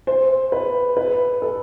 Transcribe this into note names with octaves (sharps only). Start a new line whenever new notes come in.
C5
B4
B4
A4